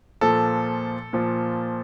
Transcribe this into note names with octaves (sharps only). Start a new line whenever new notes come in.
A#2 F3 A4
A#2 F3